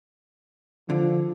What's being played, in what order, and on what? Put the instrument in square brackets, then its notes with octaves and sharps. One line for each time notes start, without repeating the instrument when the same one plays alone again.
[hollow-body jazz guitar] D3 [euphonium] F3